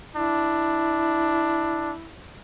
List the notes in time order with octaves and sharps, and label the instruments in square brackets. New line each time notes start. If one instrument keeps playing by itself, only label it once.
[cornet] D4 [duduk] E4